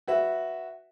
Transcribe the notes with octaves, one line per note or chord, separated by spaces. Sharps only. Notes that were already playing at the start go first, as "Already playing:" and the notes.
F#4 B4 E5